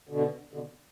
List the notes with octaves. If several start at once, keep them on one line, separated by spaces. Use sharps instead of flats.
B2 D3
B2 D3